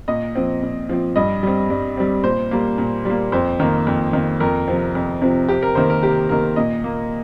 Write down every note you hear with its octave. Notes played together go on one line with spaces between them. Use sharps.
A#2 D#5
F3 C4
A#2
F3 C4
G2 D#5
G3 C4
G2
G3 C4
A#2 C5
G3 A#3
A#2
G3 A#3
F2 C5
D#3 A#3
F2
D#3 A#3
F2 A#4
C3 F3 C4
F2
C3 F3 C4
C3 G4
A#4
D#3 A#3 C5
A#4
C3 G4
D#3 A#3 A#4
A#2 D#5
A#3